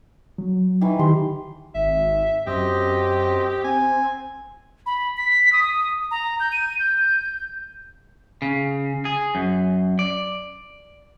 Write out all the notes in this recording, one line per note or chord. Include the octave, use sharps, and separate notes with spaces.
F#3
D#3 E3
D#3 G4 C6
G#1 E5
F#2 C4 G4 D#5 G5
C4 G#5
B5
B6
D#6
A#5
G6
D#7
G6
C#3
G#4
F#2
D5